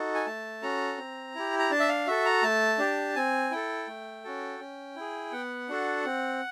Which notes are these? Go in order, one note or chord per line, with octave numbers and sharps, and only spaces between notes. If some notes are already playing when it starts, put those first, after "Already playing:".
Already playing: D#4 F#4 A4
G#5
A3 A5
C#4 F#4 A4 A#5
C4
E4 G4
A#5
D4 A5
E5
F5
F#4 A4 E5
A#5
A3 A5
D4 G4
C4 G#5
E4 A4 G5
A3
C#4 F#4 A4
C#4
E4 G#4
B3 F#5
D4 F#4 A4
C4